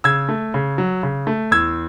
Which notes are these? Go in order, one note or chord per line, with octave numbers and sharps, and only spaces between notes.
C#3 E6 G#6
A3
C#3
F#3
C#3
A3
E2 E6 G#6